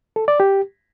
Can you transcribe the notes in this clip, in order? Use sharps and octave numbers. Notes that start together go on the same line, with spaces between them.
A4
D5
G4